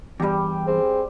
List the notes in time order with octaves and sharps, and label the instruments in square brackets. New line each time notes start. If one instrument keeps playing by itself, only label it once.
[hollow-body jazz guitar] E2 G2 [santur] G3 G4
[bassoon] C4 [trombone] G#4